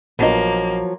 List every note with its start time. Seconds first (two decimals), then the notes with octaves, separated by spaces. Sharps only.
0.19 A#1 F3 F#3 A#3 B3 D4 D#5